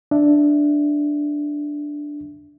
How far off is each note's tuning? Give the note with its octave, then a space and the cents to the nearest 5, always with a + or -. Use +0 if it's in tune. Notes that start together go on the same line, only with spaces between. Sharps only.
D4 +0 E5 +0